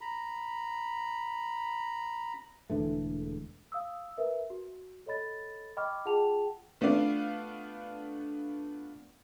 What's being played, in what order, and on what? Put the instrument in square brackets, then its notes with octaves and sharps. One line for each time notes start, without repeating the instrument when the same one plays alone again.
[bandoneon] A#5 B5
[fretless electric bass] E1 D3 E3 A3
[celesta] F5 D#6 E6
A#4 B4 E5
F#4
A4 C#5 D#5 B5 A6
D#5 G5 B5 C#6 D6 F6
F4 G#4 F#5 G5 A5 F7
[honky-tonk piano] A3 B3 D4 F4 D5 F5